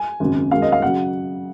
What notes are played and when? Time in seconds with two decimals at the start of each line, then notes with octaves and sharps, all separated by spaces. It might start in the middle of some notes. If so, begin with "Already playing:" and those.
Already playing: G#5
0.20 G#1 F#2 C#3
0.51 F#2 D#3 G#3 F5
0.62 D#5
0.72 F5
0.82 C#3 F#3 F#5